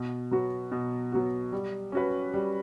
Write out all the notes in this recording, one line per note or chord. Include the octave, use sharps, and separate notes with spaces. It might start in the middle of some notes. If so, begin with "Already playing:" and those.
Already playing: B2
F#3 B3 F#4
B2
F#3 B3 F#4
G3
C#4 F#4 B4
G3